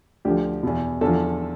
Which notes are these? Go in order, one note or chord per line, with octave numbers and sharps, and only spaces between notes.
D2 D3 F3 G4
E2 B2
E2 D3 F3 A4